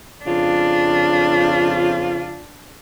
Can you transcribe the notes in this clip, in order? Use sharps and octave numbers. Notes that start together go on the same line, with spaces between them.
F2 C#3 D4 F4